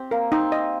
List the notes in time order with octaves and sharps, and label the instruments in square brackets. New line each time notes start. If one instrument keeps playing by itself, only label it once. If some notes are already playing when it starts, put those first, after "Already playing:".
Already playing: [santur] C4 G4 [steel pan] C5
[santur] A#3 [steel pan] A#4
[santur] C4 [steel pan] D#4
[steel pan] D#5